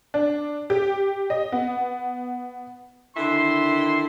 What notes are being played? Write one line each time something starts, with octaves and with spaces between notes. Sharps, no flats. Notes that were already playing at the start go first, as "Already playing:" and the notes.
D4
G4
D#5
B3
D3 D#3 E4 C6